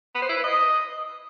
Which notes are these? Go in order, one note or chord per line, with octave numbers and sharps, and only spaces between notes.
B3
C5
E4
B4
D#5